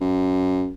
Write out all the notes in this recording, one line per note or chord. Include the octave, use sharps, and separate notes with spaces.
F#2